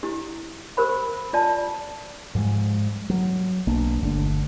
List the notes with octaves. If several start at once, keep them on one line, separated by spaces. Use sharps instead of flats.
E4 G4
G4 A#4 C5 B5
F4 D5 A5
G#2 F3 G3 G#3
F#3
B1 A#3 D4
G1 D3 A3 D4